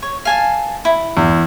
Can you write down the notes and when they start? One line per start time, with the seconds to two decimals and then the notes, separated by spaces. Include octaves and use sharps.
0.02 C#5
0.25 F5 G#5 A5
0.85 E4
1.17 E2